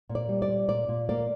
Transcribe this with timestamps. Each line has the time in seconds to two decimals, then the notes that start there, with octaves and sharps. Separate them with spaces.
0.09 A#2
0.15 D5
0.29 G3
0.42 D5
0.49 A#2
0.68 A#2 D5
0.89 A#2
1.09 A#3 D5